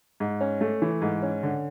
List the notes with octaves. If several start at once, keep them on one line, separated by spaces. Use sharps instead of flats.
G#2
C#4
A3
E3
G#2
C#4
D3